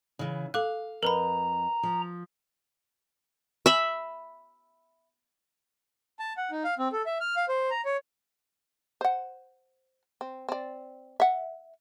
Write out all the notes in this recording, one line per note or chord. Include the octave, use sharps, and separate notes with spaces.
C#3 E3
A4 F5 D6 F#6
F2 A#4 B4 A#5 B5
F3
E5 B5
A5
F#5
D#4
F5
C4
A4
E5
F6
F5
C5
A#5
C#5
C5 F#5
C4
C4 D5
E5 F#5